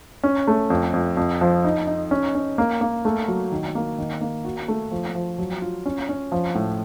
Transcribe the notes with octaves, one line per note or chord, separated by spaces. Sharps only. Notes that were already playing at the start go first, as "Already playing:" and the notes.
C#4
A3
F2
F2
F2
F3
D#4
D#4
C#4
C#4
A#3
A#3
A3
F#3
D#3
A#3
D#3
A#3
F#4
A3
F3
F3
F#3
F4
C#4
C#4
F3
A2